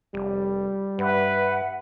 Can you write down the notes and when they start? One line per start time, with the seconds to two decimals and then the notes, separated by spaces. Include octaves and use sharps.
0.14 F1 G3
0.99 G2 B4 E5 F#5